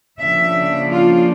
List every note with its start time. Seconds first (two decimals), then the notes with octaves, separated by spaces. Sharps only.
0.19 C#3 F3 A#3 D4 E5
0.91 F4